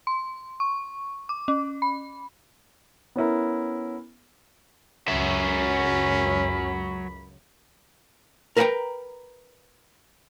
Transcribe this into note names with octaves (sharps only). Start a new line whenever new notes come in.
C6
C#6
D6
C#4
B5
B3 C#4 E4 A#4
C#2 F#2 F#3 C#4 E5 B5
A#4 B4 E5 F#5 G5 A#5